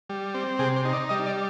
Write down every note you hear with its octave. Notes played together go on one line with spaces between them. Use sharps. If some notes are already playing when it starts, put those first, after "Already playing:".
G3
C4
C3 G#4
C5
D#4
D5
G3 D#5
D5